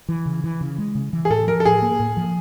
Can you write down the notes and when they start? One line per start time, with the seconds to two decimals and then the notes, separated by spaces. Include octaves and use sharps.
0.09 E3
0.26 C#3
0.44 E3
0.61 C#3
0.78 G#3
0.95 C#3
1.13 E3
1.25 G#4
1.30 A2 A4
1.47 F3 A#4
1.60 A4
1.65 A2 G#4
1.82 A#3
2.00 A2
2.17 F3